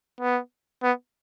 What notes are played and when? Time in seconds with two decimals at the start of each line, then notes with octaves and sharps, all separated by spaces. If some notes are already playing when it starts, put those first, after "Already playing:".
0.21 B3
0.83 B3